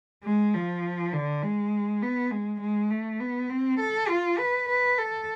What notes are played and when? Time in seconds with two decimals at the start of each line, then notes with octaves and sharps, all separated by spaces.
0.24 G#3
0.54 F3
1.14 D3
1.43 G#3
2.03 B3
2.31 G#3
2.61 G#3
2.91 A3
3.20 B3
3.50 C4
3.80 A4
4.09 F4
4.39 B4
4.69 B4
4.98 A4